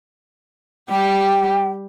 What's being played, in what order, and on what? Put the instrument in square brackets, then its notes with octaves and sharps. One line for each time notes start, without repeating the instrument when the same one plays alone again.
[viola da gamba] G3 G4 [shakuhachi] G5